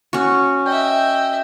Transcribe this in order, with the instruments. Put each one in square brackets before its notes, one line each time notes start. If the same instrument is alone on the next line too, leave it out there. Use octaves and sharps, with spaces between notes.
[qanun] C#4 F#4
[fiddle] D#5 E5 [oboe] G5